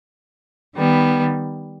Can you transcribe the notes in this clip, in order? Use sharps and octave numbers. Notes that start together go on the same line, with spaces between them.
D#3 G3 B3